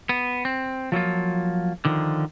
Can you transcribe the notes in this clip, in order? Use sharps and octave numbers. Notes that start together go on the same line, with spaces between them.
B3
C4
F3 F#3 A#3 F4
D3 D#3 F3